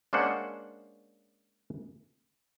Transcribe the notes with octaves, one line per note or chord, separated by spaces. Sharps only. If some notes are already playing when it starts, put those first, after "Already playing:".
G#3 A#3 C#4 D4 C5 F#5